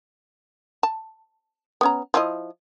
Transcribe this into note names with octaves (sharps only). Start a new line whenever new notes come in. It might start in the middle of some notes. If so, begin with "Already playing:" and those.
A5
B3 C#4 A#5
F3 E4 D#5